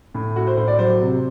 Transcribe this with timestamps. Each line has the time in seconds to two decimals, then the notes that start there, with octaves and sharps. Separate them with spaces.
0.15 A2
0.36 A3 F#4
0.47 C5
0.57 A2 C5
0.68 D5
0.78 F#3 C5
1.01 C3